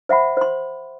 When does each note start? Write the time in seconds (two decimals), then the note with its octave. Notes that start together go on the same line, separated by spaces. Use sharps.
0.09 C5 E5 F#5 B5
0.37 C5 C6